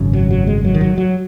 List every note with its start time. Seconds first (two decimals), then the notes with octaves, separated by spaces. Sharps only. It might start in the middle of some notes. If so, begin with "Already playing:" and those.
Already playing: G#1 F#2 C#3
0.13 F#3
0.31 F#3
0.47 G#3
0.65 F#3
0.74 D#3
0.81 F#3
0.98 F#3